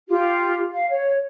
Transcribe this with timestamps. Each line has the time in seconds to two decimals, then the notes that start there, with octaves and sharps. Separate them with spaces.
0.08 F4 G4
0.71 F5
0.89 C#5